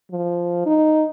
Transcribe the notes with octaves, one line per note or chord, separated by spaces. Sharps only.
F3
D#4